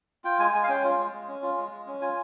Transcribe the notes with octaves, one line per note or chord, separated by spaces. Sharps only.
F4 G5
G#3 G#5
G#3 G#5
F5
C#4 G5
F4
G#3
G#3
C#4
F4
G#3
G#3
C#4
F4 G#5